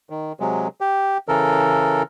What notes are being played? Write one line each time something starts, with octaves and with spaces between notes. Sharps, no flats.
D#3
C3 F#3 G#3
G4
C#3 E3 A4 A#4